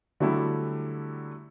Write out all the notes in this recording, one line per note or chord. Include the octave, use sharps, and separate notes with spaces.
D3 F#3 G3 A3 E4 G4